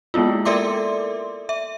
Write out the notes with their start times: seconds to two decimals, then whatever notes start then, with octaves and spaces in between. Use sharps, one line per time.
0.14 G#3 A#3 B3 E4 F4
0.45 A4 A#4 D5 E5 C6 D6
1.49 E5